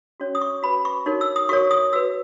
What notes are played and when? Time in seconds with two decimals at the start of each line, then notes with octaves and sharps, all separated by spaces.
0.20 C#4 F#4 C#5
0.35 D#6
0.41 C#6
0.63 F#4 B4 B5
0.85 C#6
1.06 D#4 F#4 A#4 C#5
1.21 E6
1.36 D#6
1.49 F#4 A#4 C#5 C#6
1.71 D#6
1.93 F#4 B4 E6